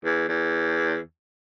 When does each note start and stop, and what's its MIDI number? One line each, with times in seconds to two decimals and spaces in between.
0.05 0.28 40
0.29 0.98 40